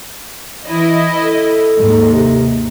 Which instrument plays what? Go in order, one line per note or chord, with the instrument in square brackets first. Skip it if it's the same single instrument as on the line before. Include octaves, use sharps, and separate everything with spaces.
[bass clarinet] E3 [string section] E4 D#5
[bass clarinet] A4
[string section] D#2 G#2
[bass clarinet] C3